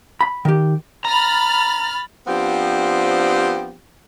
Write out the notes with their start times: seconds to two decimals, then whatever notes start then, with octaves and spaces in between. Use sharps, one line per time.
0.21 B5
0.45 D#3 G4
1.05 A#5 B5 F6 A6
2.27 F3 B3 C4 D4 G4